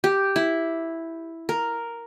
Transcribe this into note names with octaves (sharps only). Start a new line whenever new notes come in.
G4
E4
A#4